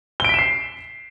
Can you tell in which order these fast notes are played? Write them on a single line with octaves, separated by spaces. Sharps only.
G7 D7 B6 E7 C7